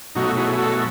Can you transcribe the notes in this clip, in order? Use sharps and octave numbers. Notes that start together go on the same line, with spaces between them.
B2 F#3 A3 D#4 F#4
E4 G#4
F#4 A4